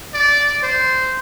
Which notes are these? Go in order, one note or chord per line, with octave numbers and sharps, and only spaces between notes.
D5
C5